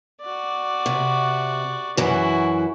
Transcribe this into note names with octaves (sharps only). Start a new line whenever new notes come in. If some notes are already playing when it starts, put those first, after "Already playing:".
F#4 D5
C3
F#2 E3 E4 F#4